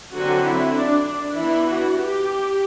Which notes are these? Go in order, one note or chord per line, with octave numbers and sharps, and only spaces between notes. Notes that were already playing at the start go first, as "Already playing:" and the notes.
D3 F#3 C4 F#4
E4
D4
D4
E3 B3 D4 E4
F#4
G4